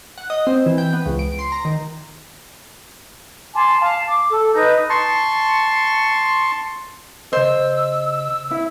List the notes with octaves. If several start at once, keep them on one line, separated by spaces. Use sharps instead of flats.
F#5
D#5
C4
E3
G5
B3
C#2
D7
C6
A#5
D#3
G#5 A5 C6 D6
F5 A5
D6
A4
D#4 B4 G6
A5 C6 C#6
C#3 C5 D#5 E6
E4